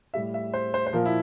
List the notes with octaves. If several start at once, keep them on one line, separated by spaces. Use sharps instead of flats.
A2 G3 E5
E5
C5
C5
C5
A#2 F3 A#4
E4